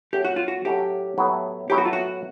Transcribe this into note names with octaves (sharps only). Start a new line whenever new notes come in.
A2 F#3 A3 C#4 G4
F#4
F4
F#4
A2 F#3 A3 C#4 G4
A2 F#3 B3 E4
A2 F#3 B3 E4 G4
F#4
F4
F#4